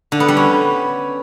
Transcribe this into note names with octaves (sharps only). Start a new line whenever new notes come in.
D3
B3
G3
C#4